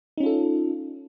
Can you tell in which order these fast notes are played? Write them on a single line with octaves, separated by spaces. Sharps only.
D#4 C#4 F4 A4